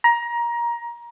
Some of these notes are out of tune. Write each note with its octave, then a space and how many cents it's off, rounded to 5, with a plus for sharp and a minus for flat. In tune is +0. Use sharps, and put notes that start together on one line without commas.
A#5 +20